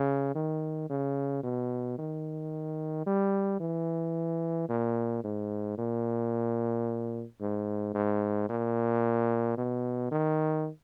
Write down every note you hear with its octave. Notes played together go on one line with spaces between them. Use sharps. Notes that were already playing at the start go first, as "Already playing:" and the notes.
Already playing: C#3
D#3
C#3
B2
D#3
G3
E3
A#2
G#2
A#2
G#2
G#2
A#2
B2
D#3